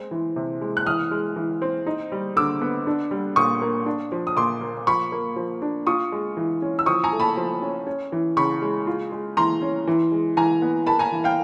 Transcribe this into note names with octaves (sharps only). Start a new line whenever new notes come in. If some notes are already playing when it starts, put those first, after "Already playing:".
Already playing: G#3 C4
E3
C3
G#3
F#6
E3 D#6 F6
G#3
E3
C4
D#4
G3
D3 D6 E6
B3
D4
G3
A#2 C#6 D#6
A#3
D4
F3
D#6
A#2 C6 D6
A#3
F3 B5 C#6
A#3
F3
D4
F4 C#6 D#6
G#3
E3
C#4
E6
F3 C#6 D#6
G#5 A#5
A3
A5 B5
F3
C#4
C#4
E3
C#3 B5 C#6
G#3
F4
G#3
E3 A#5 C6
C#4
E3
G#3
E3 G#5 A#5
B3
A#3 A5 B5
G#5 A#5
E3
F5 G5